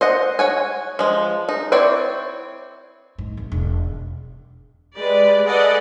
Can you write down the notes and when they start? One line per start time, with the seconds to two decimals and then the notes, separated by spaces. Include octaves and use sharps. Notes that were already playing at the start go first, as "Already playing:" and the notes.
0.01 C5 D#5 F#5
0.39 C#5 F#5 G#5
0.99 F3 G#3
1.49 D#4
1.72 C4 E4 C#5 D5 G5
3.18 G#2
3.37 G#1
3.52 E1
4.98 G#3 G4 B4 D5
5.47 A4 B4 D5 D#5 F#5 G#5